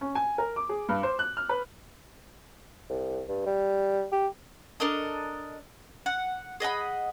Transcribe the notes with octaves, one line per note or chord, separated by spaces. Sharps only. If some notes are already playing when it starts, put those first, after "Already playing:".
C#4
G#5
A#4
D6
G#4
G2
C5
F#6
F6
B4
C2
G2
G3
G4
D4 A4 A#4 D#5
F#5
G#4 D#5 F#5 B5